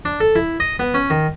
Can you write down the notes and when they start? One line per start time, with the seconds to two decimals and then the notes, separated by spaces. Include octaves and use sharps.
0.05 D4
0.20 A4
0.36 E4
0.60 D#5
0.79 B3
0.94 C#4
1.10 D#3